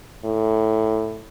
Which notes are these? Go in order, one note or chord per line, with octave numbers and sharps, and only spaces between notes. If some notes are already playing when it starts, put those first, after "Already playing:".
A2